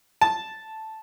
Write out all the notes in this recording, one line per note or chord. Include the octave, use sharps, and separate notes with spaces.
A5